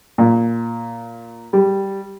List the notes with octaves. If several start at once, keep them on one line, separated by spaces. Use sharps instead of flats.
A#2
G3